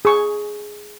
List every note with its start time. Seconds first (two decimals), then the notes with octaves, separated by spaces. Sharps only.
0.05 G#4 C#6